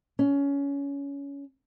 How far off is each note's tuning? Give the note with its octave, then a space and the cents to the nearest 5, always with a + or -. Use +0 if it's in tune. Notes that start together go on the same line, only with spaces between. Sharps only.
C#4 +20